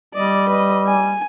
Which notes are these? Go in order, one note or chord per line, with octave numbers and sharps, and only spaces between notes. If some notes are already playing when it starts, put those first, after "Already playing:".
G3 D5 D#5
B4 D#5
G#5